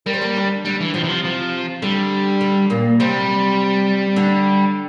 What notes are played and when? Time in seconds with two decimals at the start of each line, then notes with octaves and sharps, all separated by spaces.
0.06 G3 A#4
0.14 C5
0.22 A#3 A#4
0.36 D3 D4
0.65 D3 G3 D4
0.81 E3
0.94 C3 F3 C4
1.03 E3
1.09 F3
1.24 F3
1.82 D3 G3
2.41 D3
2.70 A#2 A#3
3.00 C3 G3 C4
4.16 D3 D4